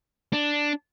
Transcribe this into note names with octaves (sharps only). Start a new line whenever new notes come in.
D4